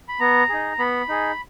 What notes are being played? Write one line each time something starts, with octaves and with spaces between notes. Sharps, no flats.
B5
B3 A#5
D#4 G#4
B3 B5
D#4 G#4